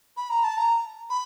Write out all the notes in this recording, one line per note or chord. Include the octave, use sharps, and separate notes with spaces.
B5
A#5
A5
A#5
B5